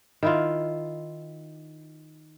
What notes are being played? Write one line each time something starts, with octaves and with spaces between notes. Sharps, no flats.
D#3 E4 F4